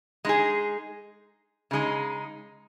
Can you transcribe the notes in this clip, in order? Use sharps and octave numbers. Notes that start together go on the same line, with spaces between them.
G#3 D#4 G#4
C#3 G#3 D#4